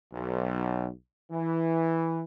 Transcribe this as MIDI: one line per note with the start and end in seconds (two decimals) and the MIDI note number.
0.13 0.89 35
1.31 2.22 52